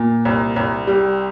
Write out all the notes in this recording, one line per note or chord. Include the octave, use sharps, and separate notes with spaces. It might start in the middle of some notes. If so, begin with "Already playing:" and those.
Already playing: A#2
C2
C2
G3